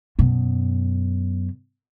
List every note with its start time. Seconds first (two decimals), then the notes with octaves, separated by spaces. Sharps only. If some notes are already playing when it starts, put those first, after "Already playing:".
0.19 F#2 B2